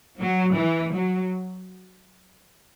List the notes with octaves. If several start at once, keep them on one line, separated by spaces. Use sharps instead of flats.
F#3
E3
F#3